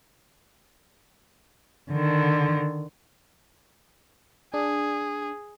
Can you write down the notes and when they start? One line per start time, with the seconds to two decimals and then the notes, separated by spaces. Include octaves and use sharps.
1.91 D3 D#3
4.54 D4 G#4